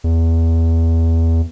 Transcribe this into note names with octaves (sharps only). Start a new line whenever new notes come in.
E2